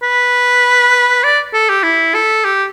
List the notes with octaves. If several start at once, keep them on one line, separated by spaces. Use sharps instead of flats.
B4
D5
A4
G4
E4
A4
G4